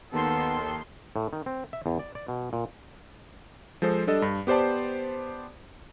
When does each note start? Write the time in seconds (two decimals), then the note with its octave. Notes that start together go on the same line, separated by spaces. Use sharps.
0.13 D#2 D#3 B3 A4 C6
1.16 A2
1.33 D#3
1.46 C4
1.73 E5
1.86 E2
1.99 D5
2.15 D5
2.28 B2
2.53 A#2
3.82 F3 G#3 A4 C5
4.07 G3 D4 A4 D#5
4.22 G2
4.47 B3 G4 C5 D5 A5